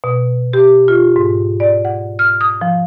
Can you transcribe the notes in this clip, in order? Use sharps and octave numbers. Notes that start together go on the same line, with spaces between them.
B2
G4
F4
G#2
D5
F#5
F6
D#6
F3